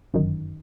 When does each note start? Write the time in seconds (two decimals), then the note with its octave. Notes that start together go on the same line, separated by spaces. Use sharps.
0.14 G1 F#2 D#3